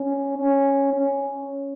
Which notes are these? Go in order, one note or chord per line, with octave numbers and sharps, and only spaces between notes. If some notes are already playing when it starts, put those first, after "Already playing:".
Already playing: C#4
C#4
C#4